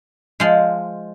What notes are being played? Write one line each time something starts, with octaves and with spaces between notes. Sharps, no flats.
F3 G#3